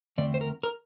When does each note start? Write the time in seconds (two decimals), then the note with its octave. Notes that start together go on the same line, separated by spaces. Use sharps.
0.18 E2 D3 A3 C4 D5
0.34 C5
0.41 A#4
0.63 A#4